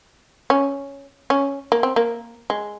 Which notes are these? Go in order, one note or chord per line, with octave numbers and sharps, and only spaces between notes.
C#4
C#4
A#3
C4
A#3
G#3